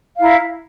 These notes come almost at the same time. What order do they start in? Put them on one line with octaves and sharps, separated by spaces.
F5 E4 A#5